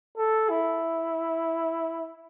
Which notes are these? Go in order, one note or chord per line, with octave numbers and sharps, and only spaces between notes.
A4
E4